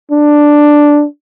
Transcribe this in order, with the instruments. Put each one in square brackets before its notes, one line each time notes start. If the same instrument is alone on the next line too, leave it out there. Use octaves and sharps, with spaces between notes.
[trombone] D4